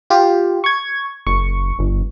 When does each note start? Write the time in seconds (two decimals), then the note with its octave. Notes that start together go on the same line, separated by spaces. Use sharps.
0.10 F4 G4
0.64 C#6 G#6
1.27 F#1 C#6
1.79 G1